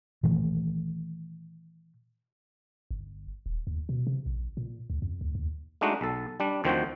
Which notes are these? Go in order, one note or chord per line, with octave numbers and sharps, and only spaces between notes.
A#2 D#3 E3 A3
G1
D#1
D#2
B2
C3
A#1
A#2
D2
F2
D2
D#2
G#3 A3 D4 D#4 F#4
B1 A4
G3 D4
D2 D#3 F3 C4 F#4 G5